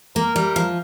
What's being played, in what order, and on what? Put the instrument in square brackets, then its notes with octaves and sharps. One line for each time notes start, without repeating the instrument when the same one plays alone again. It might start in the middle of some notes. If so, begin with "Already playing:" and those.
[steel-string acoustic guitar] A#3 [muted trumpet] A#4
[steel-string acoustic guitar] G3
F3